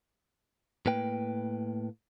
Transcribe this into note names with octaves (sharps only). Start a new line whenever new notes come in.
A2 A#3 B4 G5